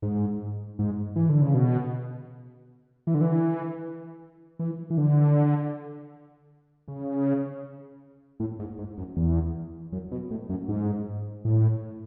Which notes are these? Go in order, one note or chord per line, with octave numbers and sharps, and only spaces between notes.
G#2
G#2
E3
D3
C#3
B2
E3
D3
E3
E3
E3
D3
C#3
A2
G#2
G#2
F#2
E2
F#2
B2
A2
F#2
G#2
A2